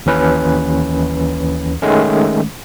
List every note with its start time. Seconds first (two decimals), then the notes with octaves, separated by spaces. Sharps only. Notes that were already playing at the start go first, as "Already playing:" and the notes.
0.06 D#2 E3 C#4 B4
1.82 D#3 G#3 A3 C#4